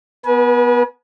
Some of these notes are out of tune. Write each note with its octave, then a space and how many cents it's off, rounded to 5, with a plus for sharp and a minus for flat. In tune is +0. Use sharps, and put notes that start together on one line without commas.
B3 +0 B4 -35 G#5 +30